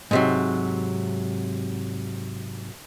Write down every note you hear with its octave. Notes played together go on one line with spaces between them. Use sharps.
G#2 C3 F#3